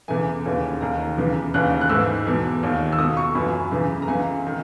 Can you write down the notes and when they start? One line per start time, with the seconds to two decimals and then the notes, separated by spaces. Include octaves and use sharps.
0.08 E2 C#3 E3 G#5
0.46 D#2 C#3 E3
0.81 D#2 D#3 A#5
1.18 E2 C#3 E3
1.54 D#2 C#3 E3 F#6
1.81 F#6
1.89 G#2 E3 E6
2.27 E2 B2
2.63 D#2 D#3
2.92 E6
2.98 C#2 B2 D#6
3.17 C#6
3.35 F#2 E3 B5
3.72 E2 C#3 E3
4.02 A#5
4.07 C#2 C#3 E3 G#5
4.47 D#3